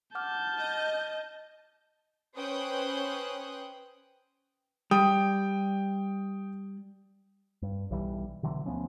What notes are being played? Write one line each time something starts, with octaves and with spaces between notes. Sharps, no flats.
F#5 A5 D6 F6 G6
D#5
C#4 B4 C5 G5 D#6 F#6
G3 G5 D#6
G2
B1 E3 G3
B2 D3 E3 F#3
D2 F3 B3 C#4